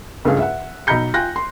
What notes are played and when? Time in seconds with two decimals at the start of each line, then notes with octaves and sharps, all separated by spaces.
0.25 C#2 G2 A3 C#4 G#4 F5
0.39 E5 F#5
0.87 B1 D#5 A#5 B5 G6 C#7
1.14 F4 G5 G#5 F#6 A#6
1.36 C6